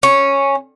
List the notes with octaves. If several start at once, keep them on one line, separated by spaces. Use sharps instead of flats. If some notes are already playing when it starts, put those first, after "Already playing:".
C#4